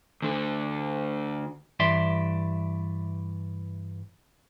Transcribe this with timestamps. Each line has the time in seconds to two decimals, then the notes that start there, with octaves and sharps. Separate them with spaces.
0.22 D2 D3
1.80 G2 E3 D5 E5 C6